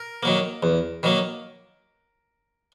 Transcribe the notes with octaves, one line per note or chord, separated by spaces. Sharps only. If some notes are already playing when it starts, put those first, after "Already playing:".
Already playing: A#4
D#3 F#3 A#3
E2
D#3 F#3 A#3